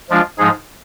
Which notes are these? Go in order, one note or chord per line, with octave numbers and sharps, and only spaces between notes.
F3 G#3 D4 F4
G#2 F3 G#3 D#4 G#4